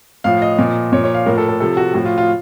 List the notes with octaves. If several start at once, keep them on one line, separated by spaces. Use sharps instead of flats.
A2 F3 F5
D#5
A#2 F3
A#2 F3 C#5
C#5
F5
A2 F3 A#4
A4
A4
C3 F3 A4
F#4
A2 F3 F#4
F4
F4